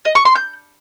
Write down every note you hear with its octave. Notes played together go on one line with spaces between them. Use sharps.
D#5
C#6
C6
G6